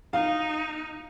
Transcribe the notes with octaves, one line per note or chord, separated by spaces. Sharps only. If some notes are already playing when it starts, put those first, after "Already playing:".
D#4 F5